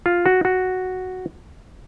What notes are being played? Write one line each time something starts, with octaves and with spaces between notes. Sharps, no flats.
F4
F#4
F#4